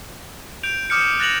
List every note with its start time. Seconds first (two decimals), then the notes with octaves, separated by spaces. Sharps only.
0.63 G6 D7 F7
0.90 D6 D#6 F6 G6 C#7
1.19 F#6 A6 A#6 C#7 F7 F#7